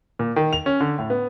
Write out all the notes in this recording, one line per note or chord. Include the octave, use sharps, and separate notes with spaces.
A#2
D#3
F7
C#4
D3
A2
B3